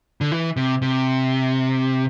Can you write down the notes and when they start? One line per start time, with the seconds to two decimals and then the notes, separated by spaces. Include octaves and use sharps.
0.21 D3
0.32 E3
0.57 C3
0.82 C3